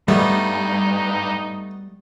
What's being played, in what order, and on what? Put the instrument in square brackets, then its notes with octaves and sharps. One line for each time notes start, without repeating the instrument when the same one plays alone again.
[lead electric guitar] G2 [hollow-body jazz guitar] G3 [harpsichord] A3 B3 [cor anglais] D#4